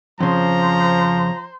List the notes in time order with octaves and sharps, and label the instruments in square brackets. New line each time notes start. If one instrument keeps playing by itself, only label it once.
[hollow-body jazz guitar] F2 C#3 [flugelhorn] F3 [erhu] C5 [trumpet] A#5